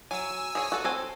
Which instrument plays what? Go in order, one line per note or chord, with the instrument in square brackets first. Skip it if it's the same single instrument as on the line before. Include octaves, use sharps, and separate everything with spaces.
[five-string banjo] F#3 [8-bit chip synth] G#5 E6
[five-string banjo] G#4 C#5
F#4 A4
C4 A4 G#5